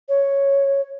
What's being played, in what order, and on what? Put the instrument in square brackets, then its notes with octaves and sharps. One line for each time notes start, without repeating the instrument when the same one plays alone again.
[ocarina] C#5